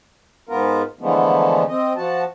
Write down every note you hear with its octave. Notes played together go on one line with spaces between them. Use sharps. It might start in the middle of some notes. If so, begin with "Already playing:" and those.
G#2 B3 F4 A#4
D3 E3 F3 G#3 A3 B3
C4 D#5
F3 F#4 A5